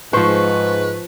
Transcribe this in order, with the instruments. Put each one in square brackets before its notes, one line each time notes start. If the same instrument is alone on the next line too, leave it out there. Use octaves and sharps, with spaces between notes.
[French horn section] G#2 [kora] F3 C5 [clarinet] B4 [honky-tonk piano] C#6